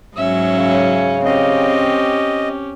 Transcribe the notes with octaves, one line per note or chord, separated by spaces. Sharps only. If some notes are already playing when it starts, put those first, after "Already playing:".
G#2 F#3 C#4 E5
C#3
C4 C#4 G4 D#5